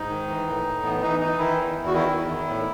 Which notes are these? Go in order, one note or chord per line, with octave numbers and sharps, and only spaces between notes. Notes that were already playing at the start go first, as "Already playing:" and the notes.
Already playing: G#2 D#4
D#3
E3
A2
A2
E3 B3
E3 D#4
E3 D#4
D#3 E4
E2
E2
F#4
D#3 E4
E2
D#3
A2